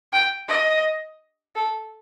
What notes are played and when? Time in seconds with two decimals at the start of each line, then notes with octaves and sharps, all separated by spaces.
0.13 G5
0.48 D#5
1.56 A4